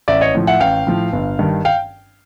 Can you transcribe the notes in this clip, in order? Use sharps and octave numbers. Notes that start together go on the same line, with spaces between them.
A1 D5 E5
C#5 D#5
A2 F3
E5 F#5
A1 F5 G5
A2 F3
G1
G2 D#3
F5 G5